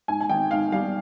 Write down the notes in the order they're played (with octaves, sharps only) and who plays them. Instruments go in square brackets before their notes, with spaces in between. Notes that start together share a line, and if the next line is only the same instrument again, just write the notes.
[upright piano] G#2 G#5
G#5
G#1 G5
G#2 F5
G3 F5